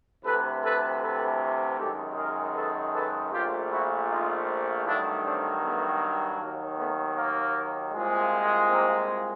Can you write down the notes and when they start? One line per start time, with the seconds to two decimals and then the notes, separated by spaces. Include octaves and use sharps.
0.25 D2 C3 E3 A4 B4
0.63 A4 B4
1.01 A4 B4
1.79 F#2 D#3 G#3 G4 A4
2.17 G#4 A#4
2.55 A4 B4
2.93 A4 B4
3.32 A#1 A#2 F3 A3 F4 G4
3.70 E4 F#4
4.09 D#4 F4
4.86 G2 D#3 F#3 A3 D4 E4
5.24 C4 D4
5.63 A3 B3
6.39 D#2 D#3 F#3 A#3
6.77 A3 B3
7.16 A#3
7.93 C2 A#2 F3 G#3
8.70 A#3 C4